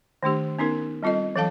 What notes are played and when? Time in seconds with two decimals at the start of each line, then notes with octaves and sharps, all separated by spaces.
0.23 D#3 A3 D4 G4
0.59 B3 C#4 D#4 A#4
1.03 G3 C4 F4 A4 D#5
1.36 E3 F#3 A4 F5 A5